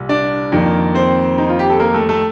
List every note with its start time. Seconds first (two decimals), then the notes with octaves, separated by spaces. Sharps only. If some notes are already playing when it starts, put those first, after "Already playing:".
Already playing: C2 A#2
0.09 D4 D5
0.52 F2 D#3 A#3
0.94 C4 C5
1.38 D#4
1.49 F4
1.59 G4
1.70 A4
1.80 A#3 A#4
1.94 A3 A4
2.09 A3 A4